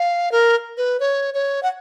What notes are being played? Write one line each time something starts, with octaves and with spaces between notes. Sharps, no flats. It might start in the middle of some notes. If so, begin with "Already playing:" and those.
Already playing: F5
A#4
B4
C#5
C#5
F#5